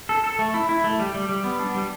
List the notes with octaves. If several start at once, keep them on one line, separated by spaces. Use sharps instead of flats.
A4
A4
A3
E4
E4
A3
G3
G3
G3
B3
D4
G3